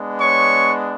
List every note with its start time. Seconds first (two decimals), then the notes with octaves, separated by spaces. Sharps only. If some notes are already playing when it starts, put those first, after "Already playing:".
Already playing: G#3 B3 D4
0.20 C#5 C#6